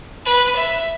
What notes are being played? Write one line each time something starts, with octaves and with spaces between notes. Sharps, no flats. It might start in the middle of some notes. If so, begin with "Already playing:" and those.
B4
E5